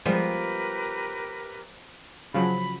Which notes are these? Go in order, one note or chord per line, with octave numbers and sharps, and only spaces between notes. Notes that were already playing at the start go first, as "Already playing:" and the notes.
F3 G3 G#3 B3 G4 A#4 B4
C#3 F3 F#3 B5